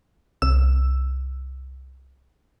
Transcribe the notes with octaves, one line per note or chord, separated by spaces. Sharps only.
C2 E6